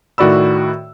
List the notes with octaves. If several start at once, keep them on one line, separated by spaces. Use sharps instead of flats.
A2 D#3 F#4 D5 B5 E6